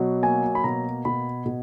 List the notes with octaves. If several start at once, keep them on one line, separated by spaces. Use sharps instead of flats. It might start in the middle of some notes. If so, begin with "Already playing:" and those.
Already playing: B2 F#3
A#3 G#5
B5
B2 A#5
B2 B5
B2